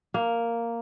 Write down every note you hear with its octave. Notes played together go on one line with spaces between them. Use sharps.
A#3